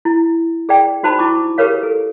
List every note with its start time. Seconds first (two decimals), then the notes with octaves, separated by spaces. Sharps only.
0.05 E4
0.69 G#4 D5 G5
1.03 D#4 F#4 C5 A5 B5
1.19 E4 C#6 D6
1.58 G4 G#4 A#4 B4 C#5 F5
1.83 A4